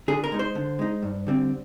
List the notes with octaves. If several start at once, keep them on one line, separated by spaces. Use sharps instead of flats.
D3 G#4
A#4
G#3 D#4
C5
D3
G#3 D#4
G2
D3 G3 C4